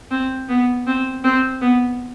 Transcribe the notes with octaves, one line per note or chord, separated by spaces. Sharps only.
C4
B3
C4
C4
B3